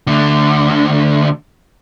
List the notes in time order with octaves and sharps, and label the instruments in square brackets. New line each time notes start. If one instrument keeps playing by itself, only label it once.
[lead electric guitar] D2 D3